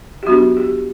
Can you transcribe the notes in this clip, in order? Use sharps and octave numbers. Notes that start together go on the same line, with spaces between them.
G4
F#3 B3 D4 F#4
G4